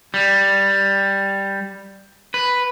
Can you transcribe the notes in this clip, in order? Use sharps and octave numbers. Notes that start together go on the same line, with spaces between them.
G3
B4